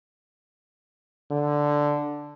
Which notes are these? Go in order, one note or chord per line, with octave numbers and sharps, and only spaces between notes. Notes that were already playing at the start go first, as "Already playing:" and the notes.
D3